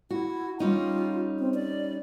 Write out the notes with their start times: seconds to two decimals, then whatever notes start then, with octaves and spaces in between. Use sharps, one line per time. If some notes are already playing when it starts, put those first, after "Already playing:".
0.11 E4 F#4
0.60 G3 C#4 D#4 F4
1.39 C4
1.54 D5